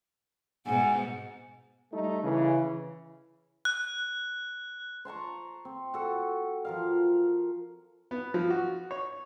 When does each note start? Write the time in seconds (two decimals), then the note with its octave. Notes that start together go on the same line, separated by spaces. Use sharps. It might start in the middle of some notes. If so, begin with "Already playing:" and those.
0.65 G#2 B2 F#5 G#5
1.93 G3 A3 D#4
2.23 C#3 E3
3.65 F#6
5.05 C5 A5 A#5 C#6
5.65 C4
5.94 F#4 A4
6.65 F3 A#4 F5
8.11 B3
8.34 F3
8.50 F#4
8.91 C#5